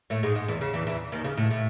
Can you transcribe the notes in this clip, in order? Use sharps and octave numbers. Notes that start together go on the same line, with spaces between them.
A2 A3
G#2 G#3
G#2 G#3
E2 E3
C#3
E2 E3
E2 E3
D#2 D#3
C#3
A2
A2